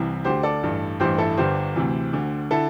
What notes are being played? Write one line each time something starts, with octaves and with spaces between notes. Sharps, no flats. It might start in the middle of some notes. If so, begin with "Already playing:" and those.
Already playing: C2 C3 E3
D2 D3 G4 C5
A4 D5
A1 G2 E3
A1 G2 E3 G4 C5
E4 A4
G1 G2 D3 G4 C5
D2 C3 E3
D2 D3
D3 E4 A4